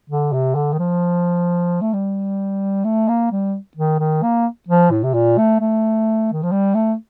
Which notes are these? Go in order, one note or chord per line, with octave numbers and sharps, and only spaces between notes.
D3
C3
D3
D#3
F3
A3
G3
A3
A#3
G3
D#3
D#3
A#3
F3
A2
C3
A#2
A3
A3
D#3
F3
G3
A3